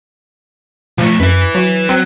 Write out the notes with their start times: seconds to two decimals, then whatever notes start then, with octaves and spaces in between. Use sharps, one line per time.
0.98 B1 F3 A3
1.20 F#2 B4 E5
1.55 F#3
1.89 F#3 C4